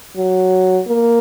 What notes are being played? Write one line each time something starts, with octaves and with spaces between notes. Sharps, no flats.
F#3
A#3